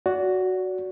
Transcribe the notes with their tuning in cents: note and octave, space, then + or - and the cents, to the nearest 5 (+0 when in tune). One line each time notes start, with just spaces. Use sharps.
F#4 +0 D5 -35